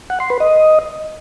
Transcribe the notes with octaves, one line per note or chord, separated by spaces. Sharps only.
F#5
C6
B4
D#5